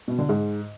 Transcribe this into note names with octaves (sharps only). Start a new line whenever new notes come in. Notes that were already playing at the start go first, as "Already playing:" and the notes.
B2
D3
G#2